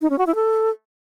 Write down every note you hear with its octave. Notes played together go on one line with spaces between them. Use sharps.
D#4
C#4
F#4
E4
A4